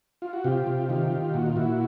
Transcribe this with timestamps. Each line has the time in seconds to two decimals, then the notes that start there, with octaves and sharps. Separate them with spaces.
0.22 F4
0.33 F#4
0.44 C3 F4 G4
0.67 C3
0.89 D#3 F4 G4
1.12 D#3
1.34 A#2 F#4
1.46 F4
1.56 A#2 E4 F#4